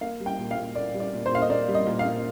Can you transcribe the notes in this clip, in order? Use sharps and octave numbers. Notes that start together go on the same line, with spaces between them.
A#3 F5
G3
G5
A#2
F5
A#2
A#3 D5
G3
D5
A#2
C5
A#2 F5
D#5
A#3 D5
G3
D#5
A#2
F5
A#2